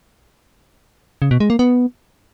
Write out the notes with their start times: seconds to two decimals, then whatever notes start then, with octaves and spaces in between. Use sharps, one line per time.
1.22 C#3
1.31 B2
1.40 G#3
1.50 A#3
1.59 B3